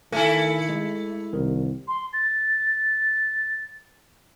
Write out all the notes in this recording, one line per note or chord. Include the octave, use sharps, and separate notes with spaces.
D#3 A3 E4 A4 G#5
G#3
C2 D#3
C6
A6